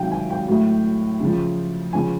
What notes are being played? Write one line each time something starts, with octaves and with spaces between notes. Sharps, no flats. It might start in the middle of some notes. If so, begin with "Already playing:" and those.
Already playing: C3 D#3 F#3 F5 G5
G#5
G5
A2 F#3
C#3 F3
C#3 F3 G#5